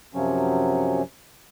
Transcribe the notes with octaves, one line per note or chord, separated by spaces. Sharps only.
F#2 C3 F3 F#3 C#4